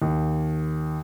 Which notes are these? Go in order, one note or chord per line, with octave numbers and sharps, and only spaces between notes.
D#2